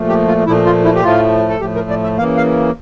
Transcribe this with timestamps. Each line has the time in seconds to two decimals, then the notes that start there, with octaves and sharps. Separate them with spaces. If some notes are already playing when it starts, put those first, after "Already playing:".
Already playing: A#2 F3 A3
0.08 G4
0.28 F4
0.46 A#2 F3 A3 E4
0.66 F4
0.85 E4
0.95 G4
1.03 A2 F3 A3 F4
1.49 A4
1.61 A2 F3 A3 G4
1.75 A#4
1.90 D5
2.03 E5
2.18 C#3 E3 A#3 F5
2.37 F5